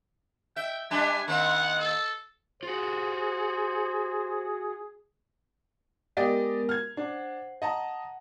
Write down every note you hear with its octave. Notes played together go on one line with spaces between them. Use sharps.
E5 G5
G3 D4 G4 G#5
D#3 A#3 C4 F#5
A4
F4 F#4 G#4 C5
G#3 B3 G4 A#4 D5 D#5
F6 G#6
D4 C5 F#5
D#5 F#5 A5 A#5